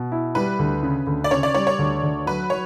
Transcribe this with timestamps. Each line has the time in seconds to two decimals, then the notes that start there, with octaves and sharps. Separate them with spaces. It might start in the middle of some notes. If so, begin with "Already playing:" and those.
Already playing: B2
0.12 E4
0.35 G3 B4
0.59 D2
0.83 C#3
1.07 D2
1.24 D5
1.31 C#3 C#5
1.43 D5
1.54 G3 C#5
1.67 C#5
1.79 D2
2.03 D2
2.26 F#3 B4
2.50 F#3 C#5